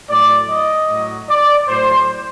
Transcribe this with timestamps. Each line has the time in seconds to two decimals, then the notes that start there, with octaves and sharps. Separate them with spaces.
0.10 A2 F#3 D5
0.50 D#5
0.89 A2 F#3
1.30 D5
1.69 A2 F#3 C5